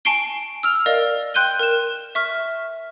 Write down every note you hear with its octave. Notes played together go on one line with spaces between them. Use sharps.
G#5 A5 C#6 C7 D7 G7
E6 F6 F7
A#4 D5 D#5 F5
G5 C6 F#6 G6 D#7 G7
A#4 E7
E5 C#6 F6